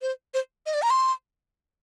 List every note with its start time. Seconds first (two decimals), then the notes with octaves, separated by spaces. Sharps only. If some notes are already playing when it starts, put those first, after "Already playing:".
0.02 C5
0.34 C5
0.66 D#5
0.74 D5
0.82 A#5
0.90 C6